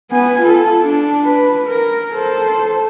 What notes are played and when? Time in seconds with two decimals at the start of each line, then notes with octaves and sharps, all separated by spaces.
0.11 B3 G#5
0.41 F4 A4
0.83 D4
1.24 B4
1.67 A#4
2.13 A4 C5